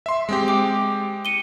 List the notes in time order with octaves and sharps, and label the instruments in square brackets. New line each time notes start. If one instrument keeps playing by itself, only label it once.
[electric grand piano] E5 C6
G#3 C4 G4
[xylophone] G5 D6
C#7 D#7 G7